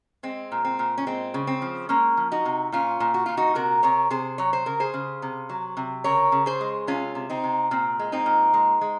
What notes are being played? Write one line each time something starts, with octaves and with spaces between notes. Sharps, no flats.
G#3 C4
A#2
C4
A#2
C#4
G#3 C4
C#3
C4
F3
G#3 A#3 C#4
F3
D#4 F#4
C3
A#2 C#4 F4
A#2
F#4
A#2 F4
D#4 F#4
C3 F#4 A#4
C3 A#4 C#5
C3 G#4 C5
F#3 C#5
C5
C#3 A#4
G#4 C5
C#3
C3
F#3
C3
C#3 A#4 C#5
C#3
G#4 C5
G#3
C3 C#4 F4
C3
C4 D#4
C3
A#2 C4
G#3
C4 D#4
A#2
G#3
G#3